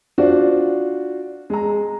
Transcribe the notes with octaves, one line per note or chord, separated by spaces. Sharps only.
D4 F4 F#4 C5
G#3 A#5